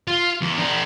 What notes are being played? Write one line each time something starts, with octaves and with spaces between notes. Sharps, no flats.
F4
E2
D4 A#4